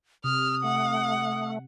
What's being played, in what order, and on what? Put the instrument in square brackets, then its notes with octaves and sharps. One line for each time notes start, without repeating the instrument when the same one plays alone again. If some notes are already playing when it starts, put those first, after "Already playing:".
[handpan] C3 [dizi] D#6 [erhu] F6
[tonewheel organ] A3 [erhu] F#5